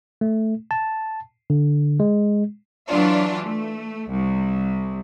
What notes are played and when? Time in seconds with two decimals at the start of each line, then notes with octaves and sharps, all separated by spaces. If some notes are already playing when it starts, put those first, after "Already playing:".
0.21 A3
0.71 A5
1.50 D3
2.00 G#3
2.88 E3 F#3 D4 F4
3.46 A3
4.11 C2